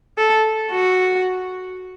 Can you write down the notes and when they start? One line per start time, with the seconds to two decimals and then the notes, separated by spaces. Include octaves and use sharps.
0.18 A4
0.72 F#4